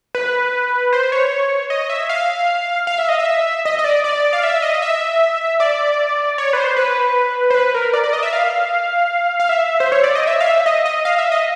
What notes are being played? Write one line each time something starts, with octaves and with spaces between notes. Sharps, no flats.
B4
C5
C#5
D#5
E5
F5
F5
E5
D#5
E5
D#5
D#5
D5
D5
F5
E5
D#5
E5
D5
C#5
B4
C5
B4
C5
B4
A#4
D5
D5
D#5
E5
F5
F5
E5
C5
C#5
D5
D#5
E5
F5
E5
D#5
D#5
F5
E5
D#5